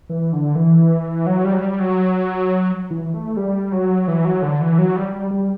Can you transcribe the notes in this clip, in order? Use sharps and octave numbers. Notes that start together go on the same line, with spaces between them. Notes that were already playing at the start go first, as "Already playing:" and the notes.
E3
D3
E3
F#3
G3
F#3
G3
F#3
E3
A3
G3
F#3
E3
F#3
D3
E3
F#3
G3
G3
G3